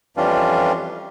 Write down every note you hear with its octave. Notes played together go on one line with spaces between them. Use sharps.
F2 E3 G3 C#4 D4 F4